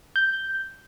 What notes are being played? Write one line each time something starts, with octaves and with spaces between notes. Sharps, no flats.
G6